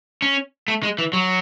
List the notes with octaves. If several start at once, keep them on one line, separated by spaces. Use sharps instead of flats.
C#4
A3
G#3
E3
F#3